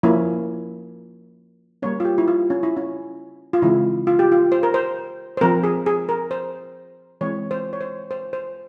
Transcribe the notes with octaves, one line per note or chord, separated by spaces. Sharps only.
F3 A#3 C#4 E4
G3 A#3 C#4 C#5
F4
G4
E4
F4
C#4
E4
C#4
F4
C#3 E3 G#3 C4 E4
F4
G4
F4
C5
A#4
C5
C5
F3 C4 A#4
G#4
G#4
A#4
C5
E3 G#3 C4 C#5
C5
C#5
C5
C5
C5